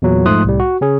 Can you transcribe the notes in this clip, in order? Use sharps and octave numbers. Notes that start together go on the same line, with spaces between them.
E2 A#2 F#3
G#2 F3 A3 C6 D#6 F#6
C2 A2 G3
F#4
C#3 C#4 G#4